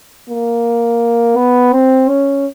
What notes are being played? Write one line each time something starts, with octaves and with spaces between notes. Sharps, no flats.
A#3
B3
C4
C#4